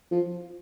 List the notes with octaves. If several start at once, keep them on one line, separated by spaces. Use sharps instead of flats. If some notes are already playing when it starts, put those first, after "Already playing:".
F3